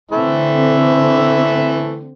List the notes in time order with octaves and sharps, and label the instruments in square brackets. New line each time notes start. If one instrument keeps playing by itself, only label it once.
[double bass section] D3 C4 [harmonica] E3 A3 E5